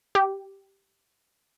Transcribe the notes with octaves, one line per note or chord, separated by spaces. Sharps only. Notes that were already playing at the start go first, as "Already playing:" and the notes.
G4